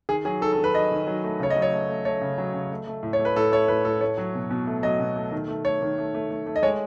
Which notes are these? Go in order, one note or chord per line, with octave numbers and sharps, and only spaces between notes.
D#3 G#4
F#3 G#4
D#3 A4
A4
D#3
B4
F#3 D#5
D#3
F#3
A3
C#3 C#5
D#5
F#3
C#5
A3
A3
A3 C#5
C#3
F#3
C#3
A3
A3
A2
C#5
A3
B4
A2 A4
A3 C#5
A2 B4
A2 A4
A3 C#5
F#3
B2
B2
A3
F#3 D#5
B2
A3
D#3
A3
A3 C#5
D#3
A3
A3
A3
A3
D#5
G#3 C#5